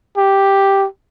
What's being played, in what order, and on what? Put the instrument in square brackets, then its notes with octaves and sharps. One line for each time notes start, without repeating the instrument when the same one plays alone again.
[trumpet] G4